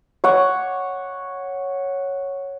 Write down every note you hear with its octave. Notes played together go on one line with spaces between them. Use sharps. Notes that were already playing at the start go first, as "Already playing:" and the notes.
C#5 F#5 D6